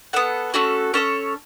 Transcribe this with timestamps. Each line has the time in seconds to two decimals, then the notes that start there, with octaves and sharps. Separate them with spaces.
0.13 B3 A4 F#5
0.54 A3 C#4 F#4 A4
0.94 C#4 A4 C#5